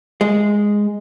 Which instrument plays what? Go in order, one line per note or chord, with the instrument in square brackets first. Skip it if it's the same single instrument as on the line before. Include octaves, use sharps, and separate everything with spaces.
[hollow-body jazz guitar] G#3